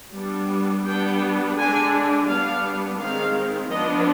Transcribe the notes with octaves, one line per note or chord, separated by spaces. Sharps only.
G3 B3 D4
G3 B3 D4 G5
D3 G#3 D4 G#5
G3 B3 D4 F5
D#3 G#3 C4 F5
F3 B3 D4 D#5